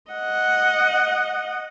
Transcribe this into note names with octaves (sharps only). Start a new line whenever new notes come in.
D#5 F#5